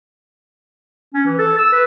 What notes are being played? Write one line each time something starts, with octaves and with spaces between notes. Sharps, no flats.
C#4
E3
A4
E6
B4